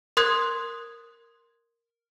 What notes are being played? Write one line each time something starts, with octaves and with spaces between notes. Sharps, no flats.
A#4 C6 D#6 F#6 G#6